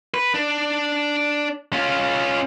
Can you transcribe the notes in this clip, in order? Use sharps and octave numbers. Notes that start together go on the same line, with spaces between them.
B4
D4
C#4 F4